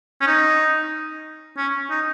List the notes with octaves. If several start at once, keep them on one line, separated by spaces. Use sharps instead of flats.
C#4
D#4
C#4
D#4